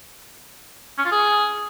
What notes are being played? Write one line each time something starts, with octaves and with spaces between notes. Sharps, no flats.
C#4
F4
G#4